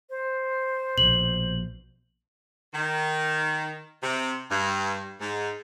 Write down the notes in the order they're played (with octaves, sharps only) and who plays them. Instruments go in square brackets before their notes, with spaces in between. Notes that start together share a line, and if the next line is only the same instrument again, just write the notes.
[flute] C5
[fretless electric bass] A#1 B2 [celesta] F#7
[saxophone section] D#3
C3
G2
G#2